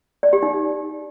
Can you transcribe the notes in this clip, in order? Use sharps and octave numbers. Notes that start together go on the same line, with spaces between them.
D5
G4
D#4